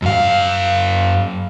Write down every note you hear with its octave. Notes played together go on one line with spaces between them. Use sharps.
F#2 F5